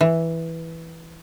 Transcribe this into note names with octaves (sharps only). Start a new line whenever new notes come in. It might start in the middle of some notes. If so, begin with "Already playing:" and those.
E3